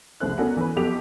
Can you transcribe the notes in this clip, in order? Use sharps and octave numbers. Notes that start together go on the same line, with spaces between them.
F1 C2 C#3 C5 F#6
B3 C#4 D4 F#4 A4 A#4
E3 B3 C#4 A4 B4
F#1 F2 B3 F#4 G4 F7